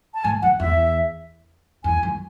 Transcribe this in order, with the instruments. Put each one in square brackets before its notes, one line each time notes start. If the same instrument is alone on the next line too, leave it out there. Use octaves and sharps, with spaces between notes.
[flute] A5
[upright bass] G#2 [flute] G#5
[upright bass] F#2 [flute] F#5
[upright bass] E2 [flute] E5
[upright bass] E2 [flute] G#5
[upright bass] F#2